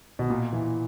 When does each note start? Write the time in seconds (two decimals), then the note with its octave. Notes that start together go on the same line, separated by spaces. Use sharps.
0.19 B2
0.30 A#2
0.53 E3